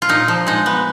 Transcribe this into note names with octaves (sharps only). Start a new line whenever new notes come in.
F4
A#2 D#4
F3
G#3 D#4
B3